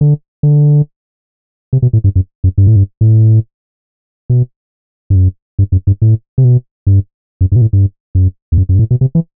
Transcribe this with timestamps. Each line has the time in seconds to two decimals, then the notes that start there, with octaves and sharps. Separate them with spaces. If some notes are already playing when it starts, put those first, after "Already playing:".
0.01 D3
0.43 D3
1.73 C3
1.82 B2
1.93 A2
2.04 G2
2.16 F#2
2.44 F#2
2.58 G2
2.67 A2
2.76 G2
3.01 A2
4.30 B2
5.10 G2
5.15 F#2
5.59 G2
5.72 F#2
5.87 G2
6.02 A2
6.38 C3
6.44 B2
6.87 G2
7.41 F#2
7.52 G2
7.56 B2
7.61 A2
7.73 G2
8.15 F#2
8.52 E2
8.58 F#2
8.69 F#2
8.75 G2
8.79 A2
8.91 B2
9.01 C3
9.15 E3